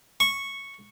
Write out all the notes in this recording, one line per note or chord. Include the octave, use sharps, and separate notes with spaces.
C#6